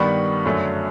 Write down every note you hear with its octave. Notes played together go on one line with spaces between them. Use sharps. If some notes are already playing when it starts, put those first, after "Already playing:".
Already playing: G2 D#3 G3 B3 B5 C#6
F#2 D3 F#3 A3